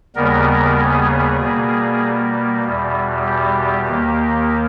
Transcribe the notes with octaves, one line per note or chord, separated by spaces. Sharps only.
D#2 C#3 G3 B3 A#4
G#4
B2 G3 A#3
E2 B2 G3
G4
D#2 D#3 A#3